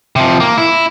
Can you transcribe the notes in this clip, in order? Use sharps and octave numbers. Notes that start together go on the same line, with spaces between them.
C3 F3
A#3
E4